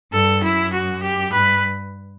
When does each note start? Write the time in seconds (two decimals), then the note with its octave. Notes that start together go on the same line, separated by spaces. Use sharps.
0.13 G2 A4
0.43 F#2 E4
0.73 F#4
1.03 G4
1.33 G2 B4